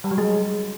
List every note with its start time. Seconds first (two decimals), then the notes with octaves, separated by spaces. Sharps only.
0.04 G3
0.11 F#3
0.18 G#3